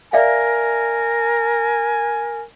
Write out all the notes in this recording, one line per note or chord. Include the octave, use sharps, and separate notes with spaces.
A#4 D5 E5 F5 G#5